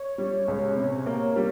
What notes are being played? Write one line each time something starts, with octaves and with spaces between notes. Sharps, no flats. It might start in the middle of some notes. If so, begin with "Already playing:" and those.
Already playing: C#5
G3
C#2
C3
A#3
G3 A#4